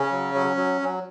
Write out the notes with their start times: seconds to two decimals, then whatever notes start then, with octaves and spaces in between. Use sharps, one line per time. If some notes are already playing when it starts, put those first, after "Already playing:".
Already playing: C#3 C#4
0.11 F#3
0.35 F#3
0.57 F#3
0.81 F#3